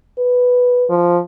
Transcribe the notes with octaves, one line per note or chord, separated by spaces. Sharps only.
B4
F3